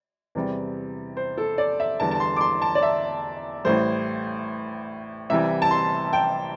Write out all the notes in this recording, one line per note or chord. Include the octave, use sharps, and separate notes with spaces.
E2 C3 G3
C5
A4
D5
E5
E2 D3 G3 A5
A5
C6
D6
C6
A5
D5
E5
A1 A2 G3 C5
C2 C3 E3 G3 E5
A5
C6
G5